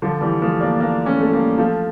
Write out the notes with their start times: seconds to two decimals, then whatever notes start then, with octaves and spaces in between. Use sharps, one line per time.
0.02 D3 F3
0.21 E3 G3
0.42 F3 A3
0.61 A#3 D4
0.80 A#3 D4
1.06 A3 C#4
1.20 A3
1.33 G3 A#3
1.58 F3 A3